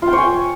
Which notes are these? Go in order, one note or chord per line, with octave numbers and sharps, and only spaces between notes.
F4
G5
C#5
G#5